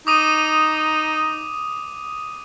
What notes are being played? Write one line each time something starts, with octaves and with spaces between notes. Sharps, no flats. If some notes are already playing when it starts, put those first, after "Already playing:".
D#4 D6 D#6 D#7